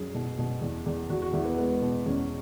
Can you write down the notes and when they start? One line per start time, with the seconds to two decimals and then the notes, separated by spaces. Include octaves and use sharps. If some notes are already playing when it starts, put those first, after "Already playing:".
Already playing: F#2 G#4
0.14 B2
0.38 B2
0.61 E2
0.86 E2
1.10 E2 F#4
1.22 F#4
1.33 E2 E4
1.45 B3
1.57 G#3 B3
1.81 B2
2.06 E2 C#4